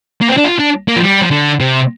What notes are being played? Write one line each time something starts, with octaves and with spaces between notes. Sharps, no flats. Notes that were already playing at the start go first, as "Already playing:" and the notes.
A#3
C4
D4
F4
D4
A#3
F3
G3
F3
D3
C3